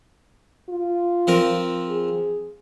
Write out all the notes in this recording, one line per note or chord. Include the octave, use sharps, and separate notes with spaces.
F4
F3 C4 A#4
G#4